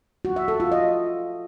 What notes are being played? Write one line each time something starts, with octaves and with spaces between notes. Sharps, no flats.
F#4
E5
A4
F4
D#5